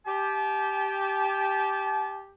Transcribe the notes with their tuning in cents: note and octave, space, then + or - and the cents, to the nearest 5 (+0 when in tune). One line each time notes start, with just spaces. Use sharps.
G4 +0 A5 -35